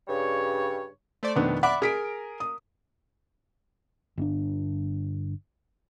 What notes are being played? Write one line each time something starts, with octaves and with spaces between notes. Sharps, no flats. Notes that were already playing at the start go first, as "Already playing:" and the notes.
G2 C#3 G3 C#5
A3 C5 D5
F2 B2 D#3 A3 B3 D4
D5 E5 F#5 B5 D6 F#6
G#4 A#4 B6 D7
D#6
G1 C4 D4